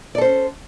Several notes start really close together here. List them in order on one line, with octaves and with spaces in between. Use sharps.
D5 A4 C5 C#4